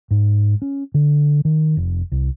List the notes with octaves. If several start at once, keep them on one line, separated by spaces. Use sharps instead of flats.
G#2
C#4
D3
D#3
F1
C2